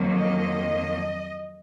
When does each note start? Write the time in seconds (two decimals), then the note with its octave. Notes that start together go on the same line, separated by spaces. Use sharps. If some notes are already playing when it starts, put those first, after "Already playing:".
Already playing: F2 D#3 F#3 A#3
0.16 D#5